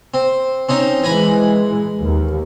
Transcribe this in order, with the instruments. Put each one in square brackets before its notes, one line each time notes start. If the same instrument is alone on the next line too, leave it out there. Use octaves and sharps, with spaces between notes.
[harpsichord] C4
C4 C#4 D#4
[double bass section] E3 G#3 [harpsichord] G#5 A#5 B5
[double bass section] D#2